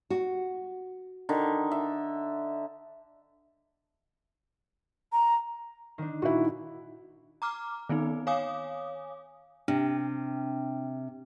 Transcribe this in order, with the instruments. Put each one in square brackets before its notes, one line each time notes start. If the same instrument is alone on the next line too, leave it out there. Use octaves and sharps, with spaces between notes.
[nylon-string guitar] F#4
[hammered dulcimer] D3 D#3
E5
[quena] A#5
[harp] D#3 D4
[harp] A#2 [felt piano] E4 F#4
[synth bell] A#5 D6 F6
D#3 B3 C4 D#4
C#5 F5 G#5 D6 D#6
[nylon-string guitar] C3 [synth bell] D4